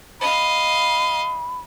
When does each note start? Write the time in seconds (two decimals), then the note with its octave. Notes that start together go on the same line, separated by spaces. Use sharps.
0.21 D#5 F5 B5